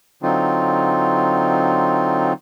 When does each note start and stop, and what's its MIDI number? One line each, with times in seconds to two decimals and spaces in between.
0.23 2.33 50
0.23 2.33 54
0.23 2.33 60
0.23 2.33 63
0.23 2.33 65